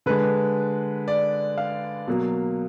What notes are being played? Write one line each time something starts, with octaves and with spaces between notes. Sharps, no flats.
D3 G#3 B4
D5
F5
B2 F#3 A#3